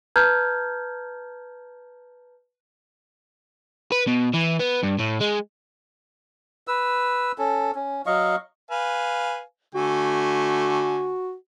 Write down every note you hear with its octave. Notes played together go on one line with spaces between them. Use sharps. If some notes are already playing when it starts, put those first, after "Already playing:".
B4 A5 A#5 F6 G6 G#6
B4
B2
E3
B3
G2
A2
G#3
B4 E6
C#4 A4
C#4
F#3 D#5 F5 C#6
B4 F5 G#5
D3 A3 F#4 G#5